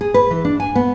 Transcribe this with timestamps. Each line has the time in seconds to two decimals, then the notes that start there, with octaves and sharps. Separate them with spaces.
0.01 G#4
0.14 B4
0.31 E3
0.45 D4
0.60 G#5
0.75 B3